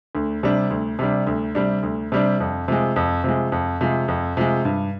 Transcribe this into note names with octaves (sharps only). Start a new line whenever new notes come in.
D2
C3 G3 D4
D2
C3 G3 D4
D2
C3 G3 D4
D2
C3 G3 D4
F2
C3 F3 G#3
F2
C3 F3 G#3
F2
C3 F3 G#3
F2
C3 F3 G#3
G2